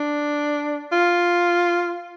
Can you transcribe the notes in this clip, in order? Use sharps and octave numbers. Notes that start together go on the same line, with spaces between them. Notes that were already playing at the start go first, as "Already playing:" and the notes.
Already playing: D4
F4